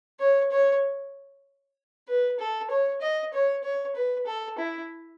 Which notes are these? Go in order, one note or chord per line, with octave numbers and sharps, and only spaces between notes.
C#5
C#5
B4
A4
C#5
D#5
C#5
C#5
B4
A4
E4